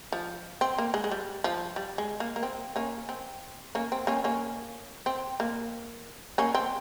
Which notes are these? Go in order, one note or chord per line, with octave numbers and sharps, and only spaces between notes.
F3
C4
A#3
G#3
G#3
G3
F3
G3
G#3
A#3
A#3
C4
A#3 C#4
C4
A#3 C#4
C4
A#3 C#4
A#3 C#4
C4
A#3
A#3 C#4
C4